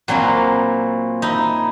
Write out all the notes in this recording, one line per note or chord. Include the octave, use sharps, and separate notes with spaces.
A#2 F#3 C4 D4 E4 F4
D#4 E4